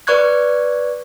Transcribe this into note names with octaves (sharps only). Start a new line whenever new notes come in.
B4 D5 C#6 F#6 G#6